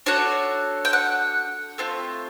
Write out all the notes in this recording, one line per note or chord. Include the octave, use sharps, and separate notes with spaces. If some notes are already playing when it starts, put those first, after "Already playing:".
D4 F#4 A4 C#5
G5
F#5
A3 C4 F4